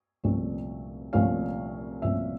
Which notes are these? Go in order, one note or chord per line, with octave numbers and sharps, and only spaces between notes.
C2 A#2 F3 A3 C#4
C2 A#2 F3 A3 C#4 F5
C2 A#2 F3 A3 C#4 E5